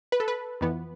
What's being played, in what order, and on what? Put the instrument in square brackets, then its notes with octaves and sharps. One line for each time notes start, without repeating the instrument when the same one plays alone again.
[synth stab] B4
A4
B4
F2 E3 B3